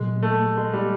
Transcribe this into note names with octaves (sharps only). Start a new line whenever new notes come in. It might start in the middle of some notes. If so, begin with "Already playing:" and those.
Already playing: A#1 A#2 F#3 G#3
A3
G#3
G3